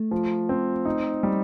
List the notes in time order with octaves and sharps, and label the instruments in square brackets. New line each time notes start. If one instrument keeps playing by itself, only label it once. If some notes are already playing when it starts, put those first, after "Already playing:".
Already playing: [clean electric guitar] A3
[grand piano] F3
C4
D#4
G3